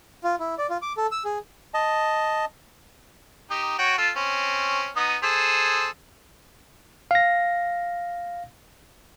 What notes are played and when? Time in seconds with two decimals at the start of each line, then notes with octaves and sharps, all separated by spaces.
0.24 F4
0.40 E4
0.58 D5
0.70 F4
0.82 D6
0.97 A4
1.12 E6
1.25 G#4
1.74 D#5 A5
3.50 D#4 G4
3.78 F#4 C#5 G5
3.98 F4 A4
4.16 C4 C#4
4.96 B3 D#4 D#6
5.23 G#4 A4 C5
7.11 F5 A#6